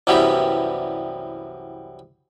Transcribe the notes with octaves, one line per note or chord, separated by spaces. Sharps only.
C2 F#2 E3 G3 B3 G4